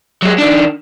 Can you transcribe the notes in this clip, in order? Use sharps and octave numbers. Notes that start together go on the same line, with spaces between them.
F#3 G#3
D#3 D4